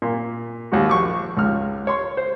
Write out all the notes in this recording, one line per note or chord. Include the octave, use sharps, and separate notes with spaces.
A#2
D#2 G#2 F#4
A#1 C#6 D6
C#2 G#2 F6
C#5 C6
C5